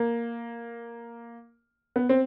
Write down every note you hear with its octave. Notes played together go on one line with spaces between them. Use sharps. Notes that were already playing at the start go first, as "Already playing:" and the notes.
Already playing: A#3
B3
C4